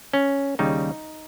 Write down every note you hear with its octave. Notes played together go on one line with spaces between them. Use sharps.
C#4
D#2 C#3 G3 D#4